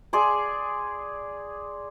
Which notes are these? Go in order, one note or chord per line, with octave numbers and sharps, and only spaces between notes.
G#4 D5 C6